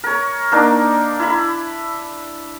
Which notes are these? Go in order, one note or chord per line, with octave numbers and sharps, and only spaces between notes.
A#4 C#5
A#3 D4 D#4
E4 B5